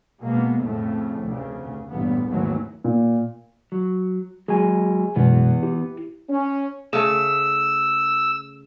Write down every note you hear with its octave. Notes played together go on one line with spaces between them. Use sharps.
B2 G#3 A#3 B3
F2 A2 C#3 A3
F1 D2 C#3
A1 G2 A#2 B3
G#1 D#2 G#2 E3 F#3 A3
A#2
F#3
F#3 G#3 G#4 G#5
F#2 B2 E3 G#3 B3
E4 G4
C#4
C#3 A3 E6